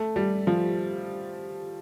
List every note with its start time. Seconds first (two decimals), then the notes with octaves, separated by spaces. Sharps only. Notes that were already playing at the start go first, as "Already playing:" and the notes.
Already playing: A3
0.16 G3
0.47 F3